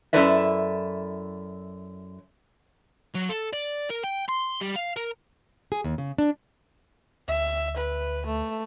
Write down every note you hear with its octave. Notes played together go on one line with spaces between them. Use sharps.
F#2 E4 A4 B4 D5 E5
F#3
A4
D5
A#4
G5
C6
G3
F5
A#4
G#4
D#2
C#3
D4
D2 E5
B4
A3